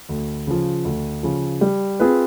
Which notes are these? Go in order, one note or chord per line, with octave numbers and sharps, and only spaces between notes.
D2
C#3 F3
D2
C#3 F3
G3
C4 F4 G#4 B4